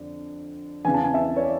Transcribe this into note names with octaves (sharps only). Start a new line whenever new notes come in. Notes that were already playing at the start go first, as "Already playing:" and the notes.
Already playing: F2 D3
E2 C#3 E3 G#5
A5
G#5
E5
C#5
D5